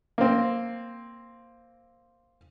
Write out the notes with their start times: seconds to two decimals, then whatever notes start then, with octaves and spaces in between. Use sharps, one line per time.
0.18 A#3 C4